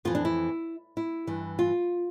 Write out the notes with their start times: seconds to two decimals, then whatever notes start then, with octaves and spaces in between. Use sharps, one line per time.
0.05 F2 E3 F4
0.15 D4
0.25 E4
0.97 E4
1.27 G2 E3
1.59 F4